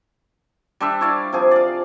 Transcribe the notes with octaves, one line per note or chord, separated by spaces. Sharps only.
G3 D4 C5 E5
E4 C#5 D5 F5
C3 F3 G#4
D5 F5